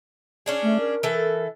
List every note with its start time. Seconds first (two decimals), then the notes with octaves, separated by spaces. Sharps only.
0.46 C#4 D4 G#4
0.63 A3
0.80 A#4
1.03 E3 A4